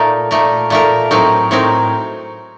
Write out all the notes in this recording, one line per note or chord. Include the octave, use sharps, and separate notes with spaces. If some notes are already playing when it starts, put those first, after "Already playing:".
Already playing: A#2 A3 D#4 A#4
A#2 A3 D#4 A#4
A#2 A3 D#4 A#4
A2 F#3 C4 D#4 A#4
A2 F#3 C4 D#4 A#4